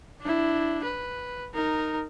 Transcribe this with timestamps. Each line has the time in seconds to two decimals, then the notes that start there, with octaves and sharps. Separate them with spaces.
0.21 D4 E4
0.84 B4
1.54 D#4 A#4